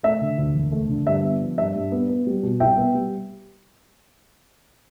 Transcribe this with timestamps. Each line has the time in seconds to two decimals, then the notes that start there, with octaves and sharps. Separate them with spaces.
0.03 A3 E5
0.21 D3
0.38 D2
0.55 E1
0.72 A3
0.89 D3
1.06 G2 E5
1.24 B3
1.42 F3
1.57 G2 E5
1.75 G2
1.92 B3
2.09 B3
2.27 G3
2.43 B2
2.60 C2 E5 G5
2.78 B3
2.94 G3